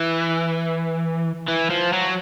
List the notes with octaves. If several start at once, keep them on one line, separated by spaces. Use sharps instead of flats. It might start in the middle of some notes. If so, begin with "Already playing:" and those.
Already playing: E3
E3
F3
F#3